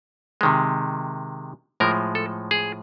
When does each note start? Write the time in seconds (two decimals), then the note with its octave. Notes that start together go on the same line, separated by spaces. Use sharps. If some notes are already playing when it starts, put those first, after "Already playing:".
0.41 C3 D#3 G#3
1.80 A2 F3 G#3 A#4
2.15 A4
2.51 G#4